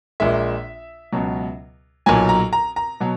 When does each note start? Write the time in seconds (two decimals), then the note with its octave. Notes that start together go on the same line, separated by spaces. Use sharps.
0.20 A#1 A#2 G#3 E5
1.12 C#2 B2 F#3
2.06 B1 A#2 F#3 G#5
2.29 A#5
2.53 A#5
2.76 A#5
3.00 B2 F#3